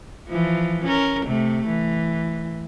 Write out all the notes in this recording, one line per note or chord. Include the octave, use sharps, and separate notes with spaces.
E3 F3
C#4 A#4
C3 A3
E3